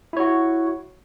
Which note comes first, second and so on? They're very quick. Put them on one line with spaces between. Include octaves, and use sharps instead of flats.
E4 C#5 F#4